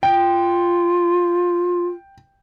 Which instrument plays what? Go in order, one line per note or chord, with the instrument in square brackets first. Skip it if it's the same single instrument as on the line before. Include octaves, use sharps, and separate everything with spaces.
[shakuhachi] F4 [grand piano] G5